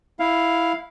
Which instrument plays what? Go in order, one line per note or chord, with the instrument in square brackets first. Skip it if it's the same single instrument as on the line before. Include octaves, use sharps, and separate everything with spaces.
[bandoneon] E4 F5